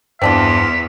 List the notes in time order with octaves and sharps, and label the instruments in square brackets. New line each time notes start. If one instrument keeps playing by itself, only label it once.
[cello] E2 [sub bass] G2 [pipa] C4 D4 F4 [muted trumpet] E5